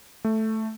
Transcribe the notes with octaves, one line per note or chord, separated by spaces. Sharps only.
A3